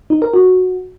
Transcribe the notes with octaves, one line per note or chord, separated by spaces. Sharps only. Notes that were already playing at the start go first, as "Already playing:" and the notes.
D#4
A#4
F#4